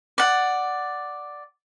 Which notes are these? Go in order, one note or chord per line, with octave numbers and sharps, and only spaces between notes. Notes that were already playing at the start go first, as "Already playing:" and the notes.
D5 F#5